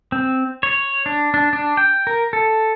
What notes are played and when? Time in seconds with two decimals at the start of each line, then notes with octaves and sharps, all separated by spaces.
0.12 C4
0.63 C#5
1.06 D4
1.34 D4
1.53 D4
1.77 G5
2.07 A#4
2.33 A4